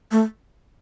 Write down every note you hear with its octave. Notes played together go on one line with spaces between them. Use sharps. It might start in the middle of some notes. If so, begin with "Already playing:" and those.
A3